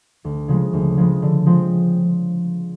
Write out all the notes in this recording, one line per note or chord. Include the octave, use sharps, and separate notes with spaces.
D2
C#3 F3 G#3
D2
C#3 F3 G#3
D3
F3 G#3 C4